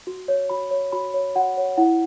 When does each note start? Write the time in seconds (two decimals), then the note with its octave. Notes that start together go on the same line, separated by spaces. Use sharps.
0.07 F#4
0.28 C#5
0.50 F#4 B5
0.71 C#5
0.92 F#4 B5
1.14 C#5
1.36 F#4 F#5
1.57 C#5
1.78 E4 F#5